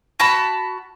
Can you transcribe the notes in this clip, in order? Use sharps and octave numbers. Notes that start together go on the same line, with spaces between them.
F#4 A5 B5